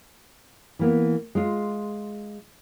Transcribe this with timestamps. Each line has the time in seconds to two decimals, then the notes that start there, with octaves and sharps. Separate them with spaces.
0.79 E3 A#3 B3
1.35 G#3 F4